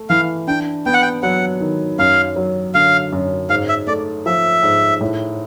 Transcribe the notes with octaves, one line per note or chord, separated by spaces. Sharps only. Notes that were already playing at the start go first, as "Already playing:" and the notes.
Already playing: A3
E3 F5
D4 G5
B3 G5
F#5
G5
F#3 F#5
D#3
F#2 F5
F#3
D3 F5
F#2
G#2 F5
E5
A3 D5
F3 E5
G#2
A2